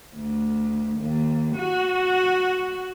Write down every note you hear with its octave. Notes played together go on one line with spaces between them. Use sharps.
D2
D#2
F#4